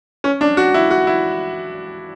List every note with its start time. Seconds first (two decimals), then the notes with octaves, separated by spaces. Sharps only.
0.24 C#4
0.41 D4
0.57 F#4
0.74 E4
0.91 F#4
1.07 E4